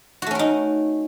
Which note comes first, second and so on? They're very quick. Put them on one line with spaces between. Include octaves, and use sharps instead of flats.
F#4 A3 C#4 A#4 D#4